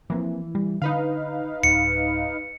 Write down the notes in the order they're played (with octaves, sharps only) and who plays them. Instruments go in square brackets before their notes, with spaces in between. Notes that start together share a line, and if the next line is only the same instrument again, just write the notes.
[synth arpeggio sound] E3 [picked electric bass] F3 A#3 C4
[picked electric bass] G3
[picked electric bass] D3 [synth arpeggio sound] D#4 B4 F5
[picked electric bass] D1 [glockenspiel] C#7